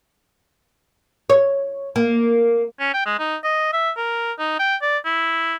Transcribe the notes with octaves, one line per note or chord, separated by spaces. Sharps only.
C#5
A#3
C#4
G5
G#3
D#4
D#5
E5
A#4
D#4
G5
D5
E4